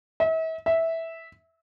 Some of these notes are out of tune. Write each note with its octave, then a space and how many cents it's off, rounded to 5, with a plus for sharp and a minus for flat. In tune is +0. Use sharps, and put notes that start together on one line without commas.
E5 -40
E5 -10